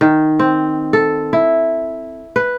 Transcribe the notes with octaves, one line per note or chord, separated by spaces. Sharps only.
D#3
C4
A4
E4
B4